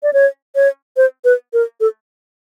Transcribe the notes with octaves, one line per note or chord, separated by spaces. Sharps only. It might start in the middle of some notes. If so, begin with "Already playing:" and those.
D5
C#5
C#5
C5
B4
A#4
A4